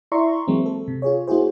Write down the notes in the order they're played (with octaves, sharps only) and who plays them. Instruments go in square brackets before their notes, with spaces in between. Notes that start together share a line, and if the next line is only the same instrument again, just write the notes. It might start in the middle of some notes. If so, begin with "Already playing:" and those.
[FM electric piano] E4 D5 E5 A#5 C6 C#6
E3 F#3 G#3 A#3 C4
A4
C3
F4 G#4 C#5
A#3 E4 F#4 G#4 C5